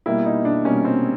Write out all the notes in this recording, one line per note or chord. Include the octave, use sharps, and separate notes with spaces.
B2 G3 A#3 E4
D#4
D4
B2 G3 A#3 C#4
C4